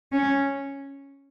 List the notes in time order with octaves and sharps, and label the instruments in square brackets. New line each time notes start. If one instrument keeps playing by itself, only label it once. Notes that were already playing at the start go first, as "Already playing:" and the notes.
[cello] C#4